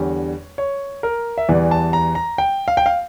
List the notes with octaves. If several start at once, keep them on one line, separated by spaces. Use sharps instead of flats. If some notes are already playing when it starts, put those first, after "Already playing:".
Already playing: E2 D3 G3 C#5
C#5
A#4
E5
E2 E3 G3 D5
A5
A#5
A#5
G5
F5
G5
F5